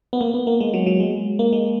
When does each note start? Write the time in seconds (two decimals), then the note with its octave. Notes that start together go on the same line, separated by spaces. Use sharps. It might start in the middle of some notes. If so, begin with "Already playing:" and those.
0.13 B3
0.21 A#3
0.34 B3
0.47 A#3
0.60 G#3
0.74 F#3
0.87 F#3
1.00 G#3
1.39 A#3
1.53 G#3